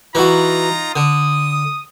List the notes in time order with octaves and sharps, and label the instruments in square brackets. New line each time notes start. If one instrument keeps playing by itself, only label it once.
[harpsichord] E3 F#4 [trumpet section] D#4 F4 A#5
[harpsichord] D3 [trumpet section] D#6